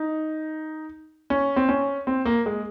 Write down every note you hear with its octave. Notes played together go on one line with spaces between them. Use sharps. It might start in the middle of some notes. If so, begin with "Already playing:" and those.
Already playing: D#4
C#4
C4
C#4
C4
A#3
G#3